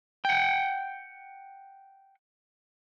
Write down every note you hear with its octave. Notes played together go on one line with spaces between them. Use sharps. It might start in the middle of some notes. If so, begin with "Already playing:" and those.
F#5 G5